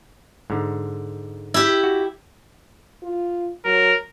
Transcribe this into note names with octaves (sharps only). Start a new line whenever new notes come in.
G#2 D3
E4 G4
F#4
F4
F#3 A#4